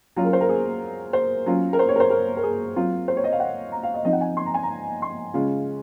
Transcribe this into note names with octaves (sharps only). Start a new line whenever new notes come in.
F#3 C#4 F4
A#4
C5
A#4
G#4
C5
F#3 C#4 F4
A#4
C5
C#5
A#4
C5
A#4
A#4
G#4
F#3 C4 F4
C5
C#5
D#5
F5
F#5
A#5
F5
D#5
F3 C4 D#4 D#5
F#5
G#5
C6
A#5
G#5
A#5
C6
C#3 G#3 C#4 F4